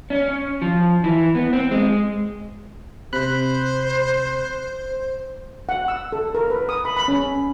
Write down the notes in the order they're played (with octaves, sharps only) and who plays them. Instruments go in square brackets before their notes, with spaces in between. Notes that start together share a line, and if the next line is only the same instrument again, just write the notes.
[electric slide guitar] C#4
F3
E3
B3
C4
G#3
[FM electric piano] C3 B5 F#6 [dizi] C5
[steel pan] F#5
E6
A4
A#4
B4
D#6
B5
B5
C#4